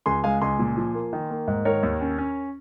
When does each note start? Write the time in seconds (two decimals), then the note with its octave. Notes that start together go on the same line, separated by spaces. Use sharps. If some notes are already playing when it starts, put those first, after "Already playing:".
0.06 C#2 G#5 C6
0.24 G#3 F5 G#5
0.41 C#2 G#5 C6
0.59 A#2
0.77 F3
0.94 A#3
1.13 D#3
1.30 A#3
1.48 G#2
1.65 D#3 A#4 C#5
1.83 D#2
2.01 C#4
2.18 C#4